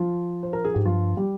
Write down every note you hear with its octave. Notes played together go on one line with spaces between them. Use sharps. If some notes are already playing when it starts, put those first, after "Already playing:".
Already playing: F3 F4
C5
A#4
G#4
G#2 G4
G2 F3 F4
G3 G4